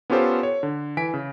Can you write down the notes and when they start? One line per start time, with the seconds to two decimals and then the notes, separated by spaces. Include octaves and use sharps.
0.10 B3 C#4 F4 G4 A4 C5
0.43 C#5
0.63 D3
0.97 E3 G#5 B6 D7
1.14 C#3